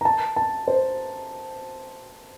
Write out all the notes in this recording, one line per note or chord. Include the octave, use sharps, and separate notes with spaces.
A#5
A5
A5
C5